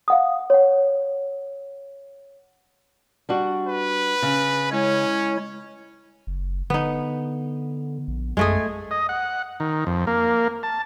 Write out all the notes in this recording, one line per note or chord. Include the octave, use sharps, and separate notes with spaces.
F5 F#5 D#6
C#5 F#5
G3 D4 F#4
B4
C#3
G#3 C#4 E4 C#5
F#1
D3 B3 D#4
A#1
F#2 G#3 A3 G#4
D#5
F#5
D#3
F2
A#3
A5